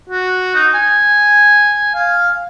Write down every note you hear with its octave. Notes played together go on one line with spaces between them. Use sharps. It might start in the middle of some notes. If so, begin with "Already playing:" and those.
F#4
D#4
G#5
F5